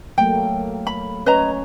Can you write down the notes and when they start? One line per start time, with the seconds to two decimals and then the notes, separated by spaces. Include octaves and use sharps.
0.18 F#3 A3 A#3 G5
0.87 B5
1.26 C#4 B4 C#5 D#5 A#5